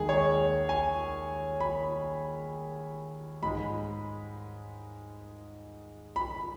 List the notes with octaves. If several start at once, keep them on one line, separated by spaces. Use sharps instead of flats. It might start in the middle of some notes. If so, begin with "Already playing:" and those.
Already playing: D#2 D#3 G#3 G#4
C#5
G#5
B5
G#2 G#3 B5
B5